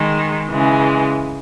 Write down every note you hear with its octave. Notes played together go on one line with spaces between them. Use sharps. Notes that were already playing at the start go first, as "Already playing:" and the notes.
Already playing: D#3 G#3
C#3 E3 G#3